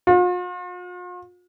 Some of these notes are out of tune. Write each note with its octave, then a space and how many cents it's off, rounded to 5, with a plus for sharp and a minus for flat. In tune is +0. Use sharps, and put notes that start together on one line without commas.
F4 +45